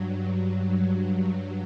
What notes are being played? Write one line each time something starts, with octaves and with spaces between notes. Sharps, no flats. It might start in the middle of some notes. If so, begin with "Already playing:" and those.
Already playing: G2 F#3